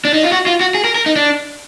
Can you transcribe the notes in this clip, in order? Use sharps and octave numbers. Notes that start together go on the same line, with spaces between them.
D4
D#4
F4
F#4
F4
F#4
G#4
A#4
A#4
D#4
D4